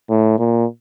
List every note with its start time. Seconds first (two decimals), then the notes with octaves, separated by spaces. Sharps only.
0.10 A2
0.39 A#2